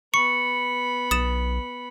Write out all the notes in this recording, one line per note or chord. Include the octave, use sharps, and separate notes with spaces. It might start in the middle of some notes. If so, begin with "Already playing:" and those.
B3 B5 C#6 C#7
B1 D#6 A6 E7